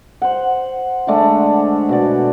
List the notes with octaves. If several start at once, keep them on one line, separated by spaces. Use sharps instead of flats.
C5 F#5
D3 G#3 A3 D4
B2 F#4 D5